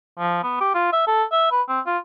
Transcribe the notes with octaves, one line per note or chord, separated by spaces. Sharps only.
F3
B3
G4
F4
E5
A4
E5
B4
C4
F4